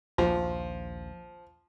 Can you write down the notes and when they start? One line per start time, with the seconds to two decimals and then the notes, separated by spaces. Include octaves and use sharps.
0.18 A#1 D#2 F3